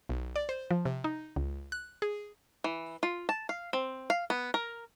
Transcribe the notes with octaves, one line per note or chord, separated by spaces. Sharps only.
B1
D5
C5
F3
C3
D#4
C#2
F#6
G#4
E3
F4
A5
F5
C4
F5
B3
A#4